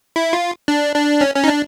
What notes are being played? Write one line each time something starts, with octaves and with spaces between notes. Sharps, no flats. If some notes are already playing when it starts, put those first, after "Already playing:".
E4
F4
D4
D4
C#4
C#4
D#4
D4